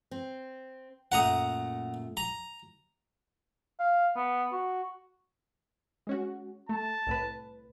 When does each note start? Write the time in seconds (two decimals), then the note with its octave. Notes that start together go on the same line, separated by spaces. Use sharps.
0.11 C4
1.12 F#2 A#2 A3 F#5 A#5 D#6
2.17 A#5
3.79 F5
4.16 B3
4.52 F#4
6.07 G#3 C#4 F#4
6.69 A3 A5
7.07 C2 A2 B4